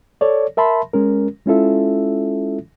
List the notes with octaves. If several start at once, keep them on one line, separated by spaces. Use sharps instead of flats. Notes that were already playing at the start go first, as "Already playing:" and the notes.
A4 C#5 D5
A#4 E5 A5 B5 C6
G#3 C#4 A#4
G#3 C#4 E4 F4 A4 E5